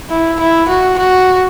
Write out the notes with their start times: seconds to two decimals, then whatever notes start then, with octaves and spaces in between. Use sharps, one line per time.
0.10 E4
0.39 E4
0.68 F#4
0.98 F#4